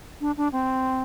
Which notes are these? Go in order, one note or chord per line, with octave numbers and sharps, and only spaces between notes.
D4
D4
C4